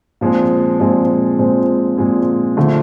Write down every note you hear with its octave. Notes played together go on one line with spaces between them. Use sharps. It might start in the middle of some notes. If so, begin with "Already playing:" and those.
A#2 F3 G#3 C4
A#2 F3 G#3 C4
A#2 F3 G#3 C4
A#2 F3 G#3 C4
D3 F3 A3